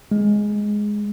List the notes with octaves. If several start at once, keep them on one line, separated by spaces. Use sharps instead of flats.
G#3